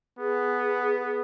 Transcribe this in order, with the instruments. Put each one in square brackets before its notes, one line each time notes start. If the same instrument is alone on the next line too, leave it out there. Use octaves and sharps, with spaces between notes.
[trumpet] B3 [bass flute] G#4